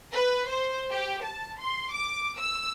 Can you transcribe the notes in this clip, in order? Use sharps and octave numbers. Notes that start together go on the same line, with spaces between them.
B4
C5
G4
A5
C6
D6
E6